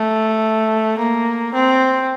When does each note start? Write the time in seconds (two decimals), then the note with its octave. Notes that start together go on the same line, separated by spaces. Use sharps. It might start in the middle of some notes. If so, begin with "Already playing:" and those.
Already playing: A3
0.98 A#3
1.54 C4